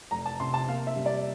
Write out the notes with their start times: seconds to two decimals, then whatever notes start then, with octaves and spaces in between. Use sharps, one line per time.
0.11 F1 A#5
0.26 A5
0.40 C3 C6
0.54 A5
0.68 A#3 F5
0.87 E5
0.96 G3
1.06 D5